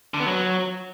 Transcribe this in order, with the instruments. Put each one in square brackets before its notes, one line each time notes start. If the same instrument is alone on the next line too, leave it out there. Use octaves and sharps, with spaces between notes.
[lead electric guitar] D3
B3
F#3